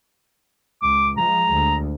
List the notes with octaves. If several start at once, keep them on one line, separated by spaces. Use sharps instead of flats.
C#2 D6
F3 G#3 A#5
D2